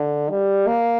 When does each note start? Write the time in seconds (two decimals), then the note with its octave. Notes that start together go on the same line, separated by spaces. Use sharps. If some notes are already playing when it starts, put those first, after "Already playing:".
Already playing: D3
0.29 G3
0.67 A#3